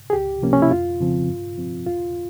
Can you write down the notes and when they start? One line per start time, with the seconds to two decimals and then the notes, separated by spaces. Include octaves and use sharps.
0.10 G#4
0.13 C#2 G4
0.42 C3 F3 A#3 C#4
0.53 C#4
0.62 E4
0.71 F2 F4
1.00 C#3 F3 C4
1.29 G2
1.58 F3 C4
1.86 E2 F4